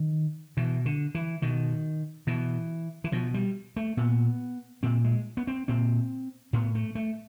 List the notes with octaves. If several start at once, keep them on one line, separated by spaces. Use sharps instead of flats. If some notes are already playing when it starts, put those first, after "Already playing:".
Already playing: D#3
B2 E3
D3
E3
B2 D#3
B2 E3
E3
B2 F3
G3
A3
A#2 B3
A#2 C4
G#3
B3
C4
A#2 C4
A2 B3
A3
A3